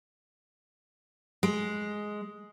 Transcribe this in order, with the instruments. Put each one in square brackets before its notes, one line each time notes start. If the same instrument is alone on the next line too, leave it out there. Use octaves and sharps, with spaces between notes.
[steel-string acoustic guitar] G#3